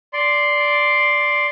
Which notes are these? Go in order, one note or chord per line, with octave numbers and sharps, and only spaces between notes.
D5 C6